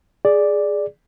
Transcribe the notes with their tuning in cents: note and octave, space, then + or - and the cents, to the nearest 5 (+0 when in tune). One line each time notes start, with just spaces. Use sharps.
G#4 +0 D5 +0